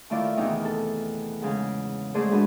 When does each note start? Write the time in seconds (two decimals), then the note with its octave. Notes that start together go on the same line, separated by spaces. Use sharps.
0.10 D#3 A3 E4 F4 D5
0.37 E2 C3 D#3 D#4
0.65 A4
1.42 G#2 C#3
2.15 G#2 G#3 A3 G#4 C5 D5
2.31 G#3 A3 D4 F#4 B4